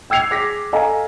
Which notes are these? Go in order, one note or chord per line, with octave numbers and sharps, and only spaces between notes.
G5 E6 G#6 C7 F7
G#4 D6 A#6 B6
A4 D#5 F5 G#5 A#5